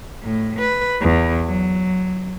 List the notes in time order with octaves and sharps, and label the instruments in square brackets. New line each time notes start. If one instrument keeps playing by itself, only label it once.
[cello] A2
B4
E2
F#3